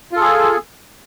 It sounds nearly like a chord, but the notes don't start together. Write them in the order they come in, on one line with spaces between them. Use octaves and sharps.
F4 A4 G#4